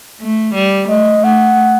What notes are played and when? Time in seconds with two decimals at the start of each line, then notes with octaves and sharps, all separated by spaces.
0.20 A3
0.54 G3
0.88 A3 D#5
1.23 A3 F#5